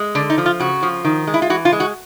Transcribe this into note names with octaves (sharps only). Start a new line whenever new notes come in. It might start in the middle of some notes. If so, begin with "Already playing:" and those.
Already playing: G#3
D3 D4
D#4
F3
F4
C#3 F#4
F3
D#3
G#3
E4
F4
E3 F#4
F4
G#3
F#4